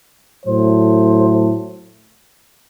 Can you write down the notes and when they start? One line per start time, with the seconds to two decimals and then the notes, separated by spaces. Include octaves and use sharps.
0.44 A2 F#3 A3 C5